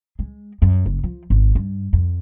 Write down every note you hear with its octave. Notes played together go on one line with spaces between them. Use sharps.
G#3
F#2
F#1
F3
G#1
G2
F2